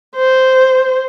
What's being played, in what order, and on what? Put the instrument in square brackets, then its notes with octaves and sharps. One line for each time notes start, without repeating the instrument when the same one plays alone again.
[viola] C5